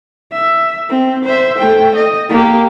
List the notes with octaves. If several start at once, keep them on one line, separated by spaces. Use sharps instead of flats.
E5
C4
C5 E5
A3 G5
D#5
A#3 G4